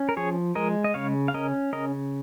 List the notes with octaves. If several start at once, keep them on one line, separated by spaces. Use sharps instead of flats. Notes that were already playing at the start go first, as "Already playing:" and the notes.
Already playing: C#4
A#4
F3 G#4 C#5
G#3 A#4 D#5
D#5
C#3 C#5 F5
F5
C#4 A#4 D#5
C#3 A#4 D#5